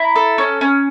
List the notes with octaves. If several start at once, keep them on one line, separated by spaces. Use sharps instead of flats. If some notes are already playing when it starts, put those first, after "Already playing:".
Already playing: E4 A#5
A4
C#4
C#4